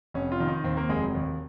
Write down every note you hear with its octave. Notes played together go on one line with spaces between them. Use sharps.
F1 C#4
F4
D#3
D#4
D#2 C4
A#3
F1 G#3
F#3
D#2